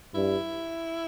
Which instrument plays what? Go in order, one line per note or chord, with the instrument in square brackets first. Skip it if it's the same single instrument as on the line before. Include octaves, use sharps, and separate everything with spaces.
[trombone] G2 [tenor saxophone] E4